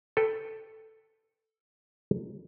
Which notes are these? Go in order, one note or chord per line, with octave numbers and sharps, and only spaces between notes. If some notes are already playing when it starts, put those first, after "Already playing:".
A4 B4 G5